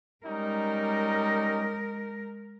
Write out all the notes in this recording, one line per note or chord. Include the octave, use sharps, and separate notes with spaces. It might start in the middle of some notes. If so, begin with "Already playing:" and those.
G3 G#3 C#4 D#4 A#4